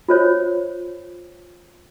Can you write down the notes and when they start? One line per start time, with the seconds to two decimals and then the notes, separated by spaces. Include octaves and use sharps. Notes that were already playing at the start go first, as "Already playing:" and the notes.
0.09 F4 C5 C#5